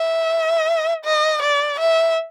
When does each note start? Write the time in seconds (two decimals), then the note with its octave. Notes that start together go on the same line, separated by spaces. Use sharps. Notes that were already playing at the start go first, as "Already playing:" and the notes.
Already playing: E5
1.05 D#5
1.42 D5
1.80 E5